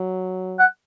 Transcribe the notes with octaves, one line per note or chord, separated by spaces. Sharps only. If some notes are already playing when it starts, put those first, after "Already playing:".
Already playing: F#3
F#5